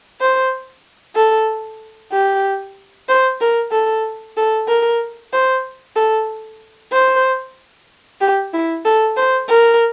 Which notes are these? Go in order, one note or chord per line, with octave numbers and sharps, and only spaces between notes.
C5
A4
G4
C5
A#4
A4
A4
A#4
C5
A4
C5
G4
E4
A4
C5
A#4